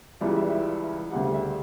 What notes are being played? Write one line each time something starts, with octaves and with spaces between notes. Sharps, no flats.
C#2 C#3 E3 G3 D5
E5
E5
D2 C#3 G3 F#5
E5